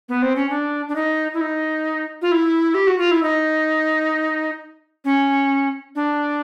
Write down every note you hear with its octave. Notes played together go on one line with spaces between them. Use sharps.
B3
C4
C#4
D4
D4
D#4
E4
D#4
F4
E4
G4
F#4
F4
E4
D#4
C#4
D4